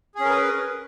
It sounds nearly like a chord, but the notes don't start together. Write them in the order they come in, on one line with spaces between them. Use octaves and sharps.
G#4 C#4 A#4 B4